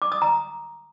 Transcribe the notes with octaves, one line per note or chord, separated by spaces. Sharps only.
D6
D#6
A#5